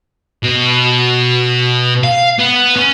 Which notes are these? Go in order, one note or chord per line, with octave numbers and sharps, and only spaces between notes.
B2
F5
B3
C#4